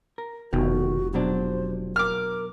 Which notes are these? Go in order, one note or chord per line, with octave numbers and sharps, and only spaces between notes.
A#4
F1 B2 D#3 F#4
B2 F#3 D4 C5
A#4 D6 F6